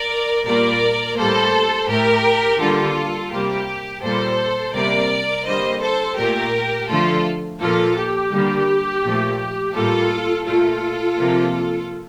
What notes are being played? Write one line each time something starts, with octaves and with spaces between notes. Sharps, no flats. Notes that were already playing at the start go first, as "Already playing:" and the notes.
Already playing: A#4 D5
A#2 G3 A#3 A#4 D5
A2 G3 A#3 A4 C5
A2 A3 G4 A#4
D3 G3 A#3 F4 A4
C3 G3 A#3 G4
A#2 G3 A#3 A4 C5
C3 G3 A#3 A#4 D5
D3 G3 A#3 C5 D#5
A4 C5
A#2 A3 G4 A#4
D3 F3 A3 F4 A4
A#2 F3 A#3 F4 A4
G4
D3 G3 A#3
A#2 F3 A3
A2 G3 A#3 F4 A4
A#2 A3 F4 A4
C3 F3 A#3